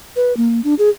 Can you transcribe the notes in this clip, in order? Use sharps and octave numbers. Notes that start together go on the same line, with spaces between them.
B4
A#3
D4
G#4